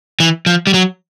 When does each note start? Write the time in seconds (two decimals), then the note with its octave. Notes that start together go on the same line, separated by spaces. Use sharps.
0.20 E3
0.46 F3
0.67 G3
0.74 F#3